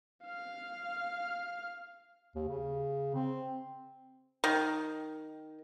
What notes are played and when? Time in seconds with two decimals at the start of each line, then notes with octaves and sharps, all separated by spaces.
0.24 F5 F6
2.35 D#2
2.48 C#3
3.15 C4
4.44 D#3